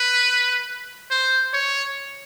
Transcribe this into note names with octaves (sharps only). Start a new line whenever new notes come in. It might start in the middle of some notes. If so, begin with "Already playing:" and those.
Already playing: B4
C5
C#5